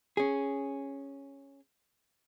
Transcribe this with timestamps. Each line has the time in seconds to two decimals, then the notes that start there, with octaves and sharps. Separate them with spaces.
0.17 C#4 G#4